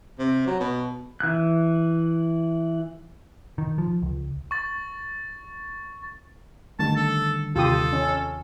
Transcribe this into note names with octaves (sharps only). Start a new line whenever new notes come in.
C3
F#3
B2
E3 F#6
D#3
F3
C#2
C#6 A6
D3 D#3 G3 A3 C#4 A5
A4
D#2 C3 F4 G4 A4 D#6
C#4